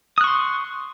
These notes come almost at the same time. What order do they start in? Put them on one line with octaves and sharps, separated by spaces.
D#6 F#6 C#6 C6